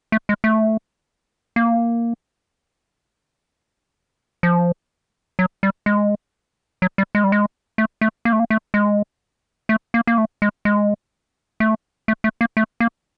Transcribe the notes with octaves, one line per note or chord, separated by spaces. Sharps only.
A3
G#3
A3
A#3
F3
F#3
G3
G#3
F#3
G3
G#3
G3
G#3
A3
A3
A#3
A3
A#3
A3
G#3
A3
A#3
A#3
A3
G#3
G#3
A3
A3
A3
A#3
A3
A#3